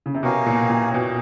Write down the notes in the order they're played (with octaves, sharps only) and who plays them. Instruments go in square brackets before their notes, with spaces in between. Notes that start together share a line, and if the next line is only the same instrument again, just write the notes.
[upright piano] C#3
C3
[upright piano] B2 [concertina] G4 A#4 C#5 F5 G#5
[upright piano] A#2
A#2
B2